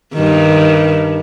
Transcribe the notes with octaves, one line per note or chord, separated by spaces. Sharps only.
G2 D#3